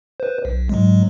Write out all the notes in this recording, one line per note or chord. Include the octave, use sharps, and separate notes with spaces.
B4 C5
B1
G#2 F#3 G#3